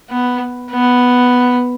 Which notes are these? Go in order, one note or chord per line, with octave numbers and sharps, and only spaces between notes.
B3
B3